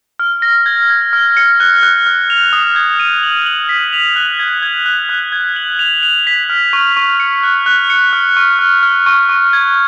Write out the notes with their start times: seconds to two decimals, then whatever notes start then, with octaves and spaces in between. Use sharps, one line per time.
0.19 F6
0.42 A#6
0.66 G#6
0.90 G#6
1.13 F6
1.37 C#7
1.60 F#6
1.83 F#6
2.07 F6
2.30 F7
2.53 D#6
2.76 G#6
3.00 D#7
3.23 F#7
3.46 F#7
3.69 B6
3.93 F7
4.16 F#6
4.39 G#6
4.62 G#6
4.86 F#6
5.09 F#6
5.32 G#6
5.56 F#7
5.79 F7
6.03 F7
6.27 B6
6.50 F6
6.73 C#6
6.96 C#6
7.20 C#7
7.43 F#6
7.66 F#6
7.90 C#7
8.13 F6
8.37 C#6
8.59 F6
8.83 F6
9.06 C#6
9.29 C#6
9.53 G#6